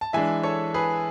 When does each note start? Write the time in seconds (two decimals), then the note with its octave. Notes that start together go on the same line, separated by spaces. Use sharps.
0.01 A5
0.13 E3 G#3 D4 E5 G#5
0.43 A4 C#5
0.74 G#4 B4